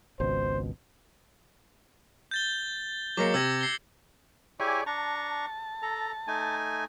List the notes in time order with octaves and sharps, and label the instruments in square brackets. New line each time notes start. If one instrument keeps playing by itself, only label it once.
[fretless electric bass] G#1 C#2 B2 [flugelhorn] C5
[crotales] G6 A6 G7
[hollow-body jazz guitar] F#3 G#3 A#3 [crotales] D6 C#7
[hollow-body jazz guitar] C3 [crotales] E6 G#6 A#6
[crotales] C7 G7
[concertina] E4 G4 G#5 [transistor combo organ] G#4 C#5 D5
[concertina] D4 A#5 C#6 [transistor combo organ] A5
[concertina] A4 A#5
A3 D#4 G#5